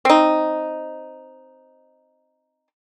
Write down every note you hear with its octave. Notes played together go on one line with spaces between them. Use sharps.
C4 D#4